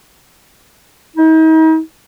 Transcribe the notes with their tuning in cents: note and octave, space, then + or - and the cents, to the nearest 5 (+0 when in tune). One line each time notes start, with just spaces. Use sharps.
D#4 +40